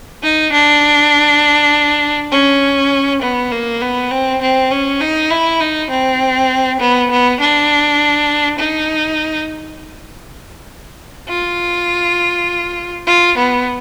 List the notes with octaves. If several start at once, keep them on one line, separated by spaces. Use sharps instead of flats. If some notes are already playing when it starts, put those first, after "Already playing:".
D#4
D4
C#4
B3
A#3
B3
C4
C4
C#4
D#4
E4
D#4
C4
B3
B3
D4
D#4
F4
F4
B3